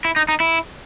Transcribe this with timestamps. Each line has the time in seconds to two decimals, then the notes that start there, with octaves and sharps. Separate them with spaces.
0.05 E4
0.16 D#4
0.29 D#4
0.40 E4